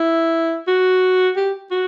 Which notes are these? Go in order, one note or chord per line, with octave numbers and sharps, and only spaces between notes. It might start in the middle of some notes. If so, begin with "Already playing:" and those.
Already playing: E4
F#4
G4
F#4